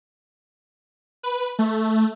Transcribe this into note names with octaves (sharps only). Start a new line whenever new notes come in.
B4
A3